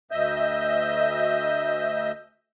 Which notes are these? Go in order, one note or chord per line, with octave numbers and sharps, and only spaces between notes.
D2 D#5 E5 G6